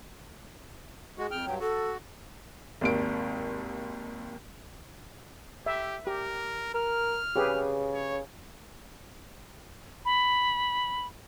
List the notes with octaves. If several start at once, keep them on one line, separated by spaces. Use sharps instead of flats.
G#3 F#4 G#4
F2 G5 F6
G2 F#3 G5
F#4 A4
G#1 D#2 D7
G4 E5
G4 A#4
A#4 F6
C#3 G4 G#4 B4
C#5
B5